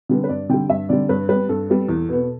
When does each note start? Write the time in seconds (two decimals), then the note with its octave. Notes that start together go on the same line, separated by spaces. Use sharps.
0.09 D3 G3 B3
0.24 B4
0.29 G2 D5
0.49 D3 G3 G5
0.69 G2 E5
0.89 D3 G3 D5
1.09 G2 B4
1.29 G3 B3 B4
1.49 G2 A4
1.69 G3 B3
1.88 E2
2.09 B2 B3